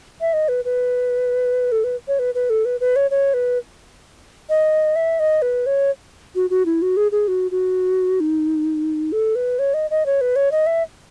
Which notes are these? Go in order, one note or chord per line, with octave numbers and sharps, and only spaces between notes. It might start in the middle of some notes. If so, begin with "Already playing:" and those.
E5
D#5
B4
B4
A4
B4
C#5
B4
B4
A4
B4
B4
C#5
C#5
B4
D#5
E5
D#5
B4
C#5
F#4
F#4
E4
F#4
G#4
G#4
F#4
F#4
D#4
A4
B4
C#5
D#5
D#5
C#5
B4
C#5
D#5
E5